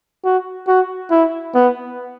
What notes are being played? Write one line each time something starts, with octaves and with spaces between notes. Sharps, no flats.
F#4
F#4
E4
B3